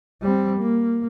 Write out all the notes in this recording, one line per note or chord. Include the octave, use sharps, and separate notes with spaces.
G3 C4
A#3